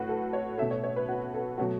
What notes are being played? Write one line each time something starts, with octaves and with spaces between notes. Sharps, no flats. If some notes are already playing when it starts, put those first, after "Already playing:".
Already playing: A2 A3 F#4 B4
A4
C#5
B2 A3 E5
C#5
C#5
B4
F#4
A4
B2 F#3 A3 F#4